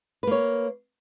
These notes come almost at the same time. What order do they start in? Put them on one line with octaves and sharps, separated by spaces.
B4 A#3 C#5